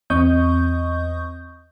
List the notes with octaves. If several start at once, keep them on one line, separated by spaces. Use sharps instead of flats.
E2 C4 D#5 C#6 D#6 G6